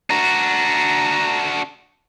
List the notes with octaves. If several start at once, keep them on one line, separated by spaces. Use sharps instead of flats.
D4 F#4 A#5